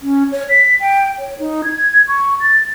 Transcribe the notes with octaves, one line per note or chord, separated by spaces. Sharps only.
C#4
C#5
B6
G5
C#5
D#4
G#6
C#6
A6